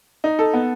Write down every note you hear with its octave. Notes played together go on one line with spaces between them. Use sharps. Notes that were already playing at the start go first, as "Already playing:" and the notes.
D#4
A4
B3